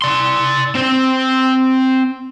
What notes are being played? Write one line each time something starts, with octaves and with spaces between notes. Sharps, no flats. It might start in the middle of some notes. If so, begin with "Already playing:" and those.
D5 C6
C4 C5